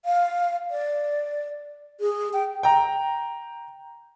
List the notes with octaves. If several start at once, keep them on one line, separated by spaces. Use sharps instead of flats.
F5
D5
G#4
G5
G5 A#5